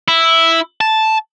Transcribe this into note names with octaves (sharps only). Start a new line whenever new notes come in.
E4
A5